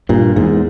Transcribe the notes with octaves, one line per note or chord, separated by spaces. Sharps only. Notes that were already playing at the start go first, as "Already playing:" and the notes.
G2 A#2
E2 G#2